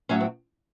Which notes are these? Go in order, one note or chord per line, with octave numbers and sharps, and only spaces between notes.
A2 F#3 C#4
C4